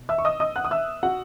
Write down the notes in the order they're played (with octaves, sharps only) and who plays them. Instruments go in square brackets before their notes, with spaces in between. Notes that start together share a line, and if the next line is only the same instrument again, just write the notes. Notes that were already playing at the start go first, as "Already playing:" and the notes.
Already playing: [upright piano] B2
E5 E6
C#6
D#5 D#6
D#5 D#6
F#5 F#6
D#6
E5 E6
F#4 F#5